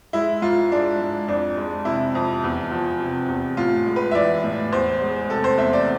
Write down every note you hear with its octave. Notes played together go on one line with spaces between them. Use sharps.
G#3 E4
G#2 F4
G#3 D4
G#2
F2 D4
G#3
C3 E4
F2
E2
F3
C3
E2
A2 F4
G#3
B4
E5
E3 D5
A2
E2 C5
G#3
C3 A4
C5
E2 E5
D5